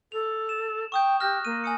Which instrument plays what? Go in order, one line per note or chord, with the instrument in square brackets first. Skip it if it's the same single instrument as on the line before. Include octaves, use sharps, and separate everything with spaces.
[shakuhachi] A4 [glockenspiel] F7
[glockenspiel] E7
[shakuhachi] G5 [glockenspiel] C#6 D#6 G6
[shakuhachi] G4 [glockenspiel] F6 F#6 A#6
[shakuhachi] A#3 [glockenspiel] D#7
[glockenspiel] G#5 D#6 C#7